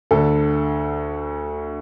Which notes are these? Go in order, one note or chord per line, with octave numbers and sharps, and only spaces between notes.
D2 D3 A4